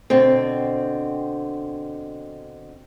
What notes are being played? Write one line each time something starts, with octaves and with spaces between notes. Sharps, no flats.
B2 D3 C4